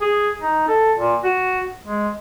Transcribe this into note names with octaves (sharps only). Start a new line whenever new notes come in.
G#4
D#4
A4
A#2
F#4
G#3